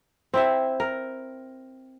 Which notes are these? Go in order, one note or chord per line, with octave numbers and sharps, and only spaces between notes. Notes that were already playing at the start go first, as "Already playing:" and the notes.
C4 E4 E5
A#4